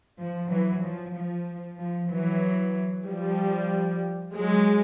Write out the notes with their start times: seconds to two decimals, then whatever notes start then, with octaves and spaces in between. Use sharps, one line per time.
0.18 F3
0.50 E3 F#3
0.82 F3
1.14 F3
1.78 F3
2.10 E3 F#3
3.06 F3 G3
4.34 F#3 G#3